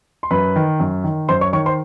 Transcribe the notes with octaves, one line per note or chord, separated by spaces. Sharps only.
C6
F#2 B4 B5
D#3
F#2
D#3
F#2 C5 C6
C#5 C#6
D#3 C#5 C#6
C5 C6